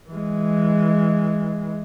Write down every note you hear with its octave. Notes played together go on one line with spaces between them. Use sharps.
E3 G#3